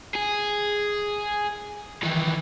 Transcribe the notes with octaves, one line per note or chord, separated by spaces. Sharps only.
G#4
D#3 E3